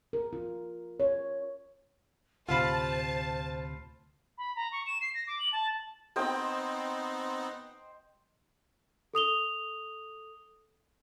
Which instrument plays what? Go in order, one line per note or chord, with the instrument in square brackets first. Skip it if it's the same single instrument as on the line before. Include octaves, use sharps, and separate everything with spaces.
[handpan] A#4
F4
C#5
[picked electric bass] D2 A2 C3 [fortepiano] F4 F5 B5 [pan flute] C5 [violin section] A5
[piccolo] B5
A#5
C#6
E7
C7
A#6
D6
F#7
A5
[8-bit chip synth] B3 C4 D#4 [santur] C5 D#5 G5
[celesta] A4 D#6 F7 G7